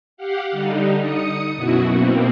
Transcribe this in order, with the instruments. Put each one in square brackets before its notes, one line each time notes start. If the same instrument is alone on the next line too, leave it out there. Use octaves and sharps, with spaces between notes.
[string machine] G4 F5 F#5
D3 G3 D#4
D#6 C#7
F#2 B2 E4 F#4
B2 A#3 C4